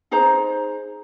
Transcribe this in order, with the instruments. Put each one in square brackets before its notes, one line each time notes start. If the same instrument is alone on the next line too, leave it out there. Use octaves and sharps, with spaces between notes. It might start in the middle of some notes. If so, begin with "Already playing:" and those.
[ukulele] D#4 G#4 C5 A#5